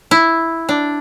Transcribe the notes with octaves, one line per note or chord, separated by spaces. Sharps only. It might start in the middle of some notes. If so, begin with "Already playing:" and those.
E4
D4